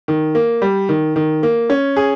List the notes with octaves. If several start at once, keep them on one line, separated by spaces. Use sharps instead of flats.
D#3
A#3
G3
D#3
D#3
A#3
C#4
G#4